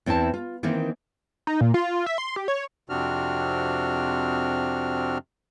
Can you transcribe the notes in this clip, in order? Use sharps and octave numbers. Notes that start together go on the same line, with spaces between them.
E2 C4 E4 C5 A5
F4
D#3 E3 A#3 C4 D#4
D#4
A#2
F4
E5
C6
G4
C#5
F2 C3 C4 D4 F#4 F6